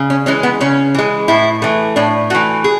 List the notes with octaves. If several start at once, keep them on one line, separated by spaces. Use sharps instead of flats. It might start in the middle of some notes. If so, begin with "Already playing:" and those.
Already playing: C#3
C#4
E3 G#3 C#4
B3
C#3 C#4
E3 G#3
A2 E4
E3 A3
A2 D4
E3 A3 F#4
G#4